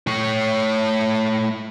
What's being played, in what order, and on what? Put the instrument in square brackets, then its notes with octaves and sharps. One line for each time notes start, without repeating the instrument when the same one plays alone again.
[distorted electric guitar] A3 C#5